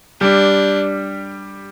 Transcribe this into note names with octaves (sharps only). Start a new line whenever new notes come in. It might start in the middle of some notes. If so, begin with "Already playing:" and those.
G3 D4 G4